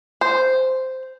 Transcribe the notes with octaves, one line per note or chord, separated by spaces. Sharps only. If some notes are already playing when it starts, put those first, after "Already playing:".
C5